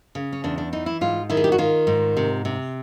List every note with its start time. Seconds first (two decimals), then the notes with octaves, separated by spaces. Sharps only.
0.15 C#3
0.33 C#4
0.44 E2 D4
0.58 D4
0.73 E3 D#4
0.86 E4
1.01 G#2 F4
1.30 D#3 E4
1.37 G#4
1.44 G4
1.52 F#4
1.58 D#3 F4
1.87 G#2
2.17 C3
2.45 C3